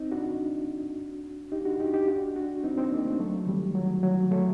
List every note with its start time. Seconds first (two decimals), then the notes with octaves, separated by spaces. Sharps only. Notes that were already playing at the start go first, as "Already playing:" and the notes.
Already playing: C4 D#4
0.12 D4 F#4
1.52 D#4 G4
1.65 D4 F#4
1.80 D#4 G4
1.93 D#4 G4
2.08 D4 F#4
2.36 D4 F#4
2.64 C4 D#4
2.78 C4 D#4
2.91 A#3 D4
3.05 A3 C4
3.20 F#3 A3
3.47 D#3 G3
3.75 F#3
4.03 F#3
4.31 F#3 A3